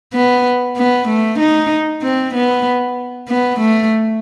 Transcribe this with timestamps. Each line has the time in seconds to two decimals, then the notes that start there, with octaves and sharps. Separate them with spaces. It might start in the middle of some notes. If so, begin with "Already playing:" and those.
0.14 B3
0.77 B3
1.08 A3
1.39 D#4
2.02 C4
2.34 B3
3.28 B3
3.59 A3